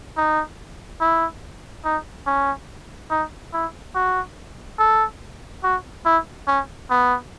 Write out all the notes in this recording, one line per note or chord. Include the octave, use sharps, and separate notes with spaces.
D#4
E4
D#4
C#4
D#4
E4
F#4
A4
F#4
E4
C#4
B3